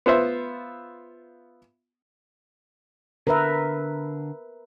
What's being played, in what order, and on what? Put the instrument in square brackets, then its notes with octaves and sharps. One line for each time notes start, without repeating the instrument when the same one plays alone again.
[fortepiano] B3 F4 C5 E5
[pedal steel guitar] D3 [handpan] A#4 B4 E5